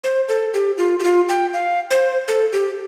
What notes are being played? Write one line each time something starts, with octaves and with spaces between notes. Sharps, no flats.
C5
A4
G4
F4
G4
F4
G5
F5
C5
A4
G4